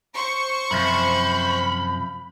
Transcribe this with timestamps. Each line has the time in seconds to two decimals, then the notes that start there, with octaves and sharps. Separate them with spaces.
0.15 C5 C#6
0.71 F#2 C3 F3 B5